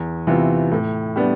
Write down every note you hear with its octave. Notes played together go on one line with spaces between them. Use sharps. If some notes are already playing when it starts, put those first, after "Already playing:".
Already playing: E2
C3 E3 B3 F4
A2
G3 B3 D4